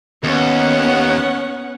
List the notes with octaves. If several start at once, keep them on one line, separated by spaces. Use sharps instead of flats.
D#2 B3 C#4 F#5